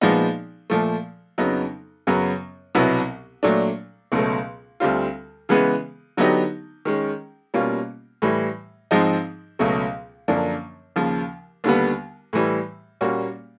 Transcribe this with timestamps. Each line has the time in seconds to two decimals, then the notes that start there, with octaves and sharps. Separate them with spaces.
0.01 A#2 F3 G#3 B3 D#4
0.70 A#2 F3 A3
1.38 F2 C#3 F#3 B3 D#4
2.07 F#2 C#3 F#3 B3
2.75 C2 B2 F#3 B3 E4
3.43 A#2 F#3 A3 D4
4.12 C#2 B2 F#3 A3
4.80 D2 D3 G3 C4 F4
5.49 C#3 E3 G#3 B3
6.17 D3 F#3 B3 D#4 G4
6.85 D#3 G#3 C#4
7.54 B2 G3 A#3 C#4 F4
8.22 A2 E3 G3
8.91 G#2 F3 G#3 C4 D#4
9.59 C#2 B2 F#3 A3
10.28 F#2 D3 F3 A#3 D4
10.96 D#2 C#3 F3
11.64 D#2 D3 G3 B3
12.33 A2 E3 G3
13.01 A#2 G3 A#3 C#4 F#4